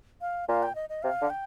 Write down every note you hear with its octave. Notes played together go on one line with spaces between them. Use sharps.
F5
A#2 F5
G5
D#5
D#5
C3 F5
D3
G5